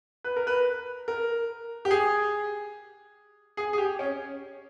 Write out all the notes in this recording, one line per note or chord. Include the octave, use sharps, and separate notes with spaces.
B4
A#4
B4
A#4
G4
G#4
G#4
G#4
G4
C#4